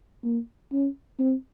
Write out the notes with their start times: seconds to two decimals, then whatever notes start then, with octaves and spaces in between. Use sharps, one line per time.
0.24 A#3
0.72 C#4
1.19 C4